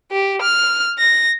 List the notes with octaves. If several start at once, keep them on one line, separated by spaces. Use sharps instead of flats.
G4
F6
A#6